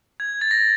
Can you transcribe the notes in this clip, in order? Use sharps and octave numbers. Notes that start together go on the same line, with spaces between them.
G#6
A6
A#6